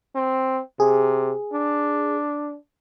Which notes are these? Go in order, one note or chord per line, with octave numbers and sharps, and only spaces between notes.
C4
C3 G#4
D4